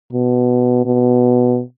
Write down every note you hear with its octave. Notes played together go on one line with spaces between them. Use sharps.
B2
B2